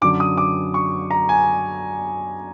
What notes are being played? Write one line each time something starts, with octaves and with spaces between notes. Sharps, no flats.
F#2 D3 F#3 D6
D#6
D6
C#6
A#5
G#5